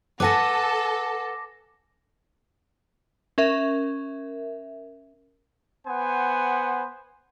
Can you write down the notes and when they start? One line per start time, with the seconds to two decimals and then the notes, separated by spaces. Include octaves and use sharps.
0.20 A4 B4 F#5 G#5 D6 A#6
3.38 C#4 A#4 E5
5.87 B3 C5 F#5 G#5